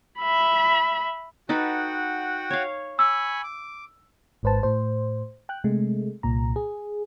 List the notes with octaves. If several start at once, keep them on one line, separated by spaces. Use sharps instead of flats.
E5 B5
D#4 F#4 A4 B4 F#5 G5
C#5 F5
G#5 B5 C#6 E6
D6
G#1 G#2 B4 C5 A5
A2 C5
G5 F#6
C3 G#3 A3
C2 A#2 A#5
G#4